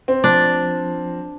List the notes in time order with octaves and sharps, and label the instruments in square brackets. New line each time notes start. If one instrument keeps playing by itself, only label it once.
[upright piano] C4
[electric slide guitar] F3 [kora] D4